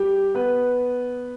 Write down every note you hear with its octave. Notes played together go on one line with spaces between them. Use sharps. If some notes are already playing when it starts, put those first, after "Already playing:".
Already playing: G3 G4
B3 B4